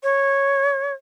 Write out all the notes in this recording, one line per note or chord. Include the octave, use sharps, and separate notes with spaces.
C#5